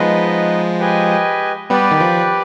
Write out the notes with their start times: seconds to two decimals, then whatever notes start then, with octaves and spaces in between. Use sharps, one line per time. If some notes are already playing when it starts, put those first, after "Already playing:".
Already playing: F3 G#3 B3 D#4 B4 D#5
0.80 G4 B4 D#5 G#5
1.70 G3 B3 G4 B4 D5
1.91 D#3
2.01 F3